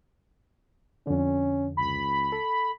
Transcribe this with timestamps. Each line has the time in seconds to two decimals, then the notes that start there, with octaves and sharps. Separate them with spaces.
1.07 F2 D3 C#4
1.77 C#2 B5
2.32 A4